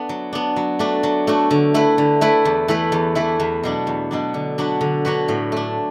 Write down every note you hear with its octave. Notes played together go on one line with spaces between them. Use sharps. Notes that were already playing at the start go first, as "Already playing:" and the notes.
Already playing: A3 B3 D4
F#3
B3 D4
F#3
A3 D4 F#4
F#3
A3 D4 F#4
D3
A3 E4 B4
D3
A3 E4 B4
E2
E3 A3 E4 B4
E2
E3 A3 E4 B4
E2
B2 F#3 D4
E2
B2 F#3 D4
D3
F#3 D4 F#4 B4
D3
F#3 D4 F#4 B4
A2
A3 D4